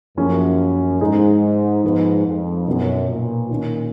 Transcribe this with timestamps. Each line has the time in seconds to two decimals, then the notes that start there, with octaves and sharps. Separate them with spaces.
0.17 F#2 F3 A#3 C#4 G#4
1.01 G#2 G#3 D#4 G#4
1.84 G#2 F3 B3 F4
2.26 F2
2.67 F#2 B2 F#3 B3
3.08 A#2
3.50 A#2 D#3 A#3 C#4